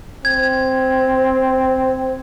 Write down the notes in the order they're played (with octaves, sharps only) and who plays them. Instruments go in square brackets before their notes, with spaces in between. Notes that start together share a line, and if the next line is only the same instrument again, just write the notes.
[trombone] C4 [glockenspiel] G#6